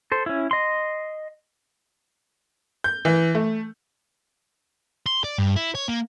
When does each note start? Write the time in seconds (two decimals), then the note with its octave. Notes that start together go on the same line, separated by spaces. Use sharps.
0.12 A4 C5
0.26 C#4 E4
0.51 D#5 C6
2.84 G6
3.05 E3
3.35 A3
5.06 C6
5.24 D5
5.38 G2
5.56 E4
5.75 C#5
5.88 A#3